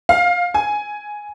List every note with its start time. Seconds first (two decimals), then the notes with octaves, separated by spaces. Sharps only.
0.09 F5
0.54 G#5